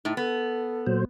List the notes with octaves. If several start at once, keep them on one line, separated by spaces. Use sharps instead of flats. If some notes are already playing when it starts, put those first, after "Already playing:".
A2 D#4
B3 A4
A#2 F#3 C5